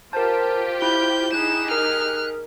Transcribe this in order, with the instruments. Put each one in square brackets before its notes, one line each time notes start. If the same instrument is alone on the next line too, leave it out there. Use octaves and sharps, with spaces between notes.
[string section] F4 G4 [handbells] A#4 A5 [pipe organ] C5
[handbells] E4 [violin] G6
[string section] D#4 G4 G#4 [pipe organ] F#6 [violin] E7
[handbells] A#4 [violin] F6